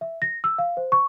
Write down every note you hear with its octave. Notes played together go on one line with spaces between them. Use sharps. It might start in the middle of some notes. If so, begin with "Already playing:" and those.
E5
A#6
E6
F5
C5
C#6